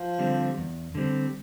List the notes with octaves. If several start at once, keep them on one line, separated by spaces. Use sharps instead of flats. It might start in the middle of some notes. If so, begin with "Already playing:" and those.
Already playing: F3
D3 G3 C4
E2
D3 G3 C4